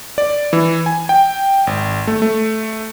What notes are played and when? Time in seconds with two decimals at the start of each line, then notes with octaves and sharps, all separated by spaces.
0.18 D5
0.53 E3
0.86 G#5
1.09 G5
1.67 G#1
2.07 A3
2.22 A3